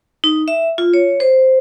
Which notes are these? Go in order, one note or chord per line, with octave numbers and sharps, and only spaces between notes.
D#4
E5
F4
C#5
C5